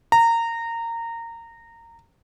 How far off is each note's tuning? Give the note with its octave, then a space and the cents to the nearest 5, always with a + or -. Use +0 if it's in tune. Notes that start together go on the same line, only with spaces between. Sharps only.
A#5 -20